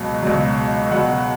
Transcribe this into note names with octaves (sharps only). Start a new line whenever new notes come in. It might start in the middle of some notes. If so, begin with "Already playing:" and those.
Already playing: C#2 B2 F#3
C#2 B2 F#3
C#2 B2 F#3 F#5